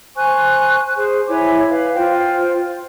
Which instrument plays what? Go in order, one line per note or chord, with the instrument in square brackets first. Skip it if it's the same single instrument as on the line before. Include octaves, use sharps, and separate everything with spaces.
[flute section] C5 G#5 C#6 F#6
G#4 C5
E4 C#5 G#5 D6
B4 F5
F4 C5 G5